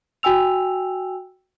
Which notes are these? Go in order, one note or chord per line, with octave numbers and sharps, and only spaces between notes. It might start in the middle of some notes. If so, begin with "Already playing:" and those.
F#4 G5 G#5 E6 F7